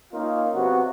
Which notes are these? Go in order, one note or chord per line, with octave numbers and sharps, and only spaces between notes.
A#3 C#4 D#4 F4
C3 F#3 B3 F#4